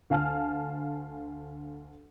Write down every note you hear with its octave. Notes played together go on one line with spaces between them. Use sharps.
D2 F5 G#5 A5 F6